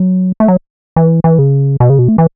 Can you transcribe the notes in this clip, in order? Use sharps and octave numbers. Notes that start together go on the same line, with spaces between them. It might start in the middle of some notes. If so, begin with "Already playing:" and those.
Already playing: F#3
A3
F#3
E3
E3
C#3
B2
C#3
B2
A3
E3